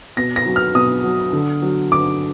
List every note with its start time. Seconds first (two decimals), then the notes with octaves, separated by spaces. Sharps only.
0.17 B2 A#6
0.36 A#6
0.46 F#3
0.56 F6
0.75 B2 D#6
1.04 F#3
1.33 D3
1.62 F#3
1.92 D3 D6